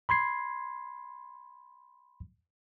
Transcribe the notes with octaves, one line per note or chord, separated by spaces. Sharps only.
B5 C6 G#6 C7